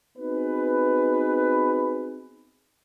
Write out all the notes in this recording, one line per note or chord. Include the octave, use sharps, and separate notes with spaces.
B3 C4 D#4 F#4 G#4 B4